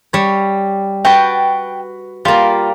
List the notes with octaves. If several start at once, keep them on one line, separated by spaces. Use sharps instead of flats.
G3 C#5
F#4 B4 G5 A5
G3 A#3 F4